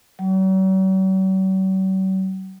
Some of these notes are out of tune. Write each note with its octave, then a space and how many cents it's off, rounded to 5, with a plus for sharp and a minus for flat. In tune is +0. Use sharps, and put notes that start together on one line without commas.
F#3 +45